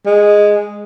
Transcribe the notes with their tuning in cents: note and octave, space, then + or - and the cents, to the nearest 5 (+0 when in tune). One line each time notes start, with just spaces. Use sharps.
G#3 -5